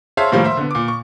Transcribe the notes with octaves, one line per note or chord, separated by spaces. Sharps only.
G#4 C5 C#5 E5 F5 A5
A2 D#3 F3 G3 A#3
C5 E5
D3 B3
A#2 D6
C#6